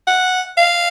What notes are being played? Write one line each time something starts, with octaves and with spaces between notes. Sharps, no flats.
F#5
F5